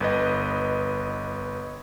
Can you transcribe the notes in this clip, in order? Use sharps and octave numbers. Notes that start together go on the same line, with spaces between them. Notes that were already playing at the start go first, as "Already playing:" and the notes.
G1 B4 D#5